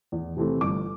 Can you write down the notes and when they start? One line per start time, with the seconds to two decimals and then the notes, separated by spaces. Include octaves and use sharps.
0.12 E2
0.36 C3 E3 A3 C4
0.61 G1 D6